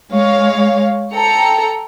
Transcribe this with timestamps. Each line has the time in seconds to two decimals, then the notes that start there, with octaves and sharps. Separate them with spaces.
0.12 G#3 C#5 F5
1.14 A4 G5 A#5 C#7